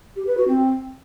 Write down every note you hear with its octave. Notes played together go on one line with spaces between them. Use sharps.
G4
B4
F#4
C4